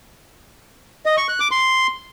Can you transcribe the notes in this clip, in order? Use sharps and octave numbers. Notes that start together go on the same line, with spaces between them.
D#5
C#6
F#6
D6
C6